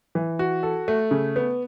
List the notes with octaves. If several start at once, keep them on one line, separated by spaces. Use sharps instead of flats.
E3
F#4
A4
A3
C#3
B3